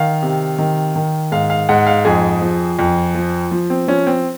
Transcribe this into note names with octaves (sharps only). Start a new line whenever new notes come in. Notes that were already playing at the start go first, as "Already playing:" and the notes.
Already playing: D#3 F5
C3
D#3
D#3
G#2 F5
F5
G#2 F#5
F5
F2 G#4
F3
F2
F3
F3
C4
F3 C#4
C4